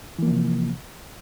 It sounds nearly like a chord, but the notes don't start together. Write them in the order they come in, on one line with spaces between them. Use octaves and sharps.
E3 A#3 F3 C3